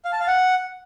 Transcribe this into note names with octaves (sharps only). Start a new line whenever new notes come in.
F5
A5
F5
F#5